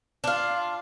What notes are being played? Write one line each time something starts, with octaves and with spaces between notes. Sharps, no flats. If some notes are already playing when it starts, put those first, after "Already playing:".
D4 F4